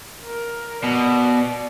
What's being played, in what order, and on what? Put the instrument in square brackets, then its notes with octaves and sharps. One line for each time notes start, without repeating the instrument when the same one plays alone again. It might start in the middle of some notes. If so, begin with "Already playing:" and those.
[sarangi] A#4
[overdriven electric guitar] B2 [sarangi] D5